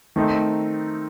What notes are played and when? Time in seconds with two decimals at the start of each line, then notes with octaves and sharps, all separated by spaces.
0.16 D#3 A3 C4 D#4